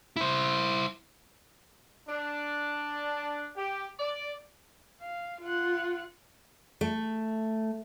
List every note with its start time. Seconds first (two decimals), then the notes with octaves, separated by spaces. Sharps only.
0.16 E4 C5
2.09 D4
3.56 G4
3.99 D5
5.01 F5
5.41 F4 F#5
6.81 A3